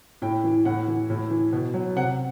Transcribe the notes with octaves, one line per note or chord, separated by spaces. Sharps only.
A2 G5
E3
A2 F#5
E3
A2
E3
B2
F#3
C3 F#5